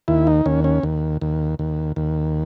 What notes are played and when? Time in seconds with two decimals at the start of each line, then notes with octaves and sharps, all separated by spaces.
0.08 D#2 E4
0.27 D#4
0.46 D#2 C#4
0.64 C#4
0.83 D#2
1.21 D#2
1.59 D#2
1.96 D#2